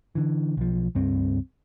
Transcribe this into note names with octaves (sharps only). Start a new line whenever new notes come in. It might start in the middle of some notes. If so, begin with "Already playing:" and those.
D3 E3
B1 F3
C#2 G2 C4